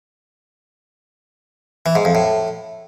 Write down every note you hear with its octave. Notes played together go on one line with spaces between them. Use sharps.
E3
G#2
F2
A2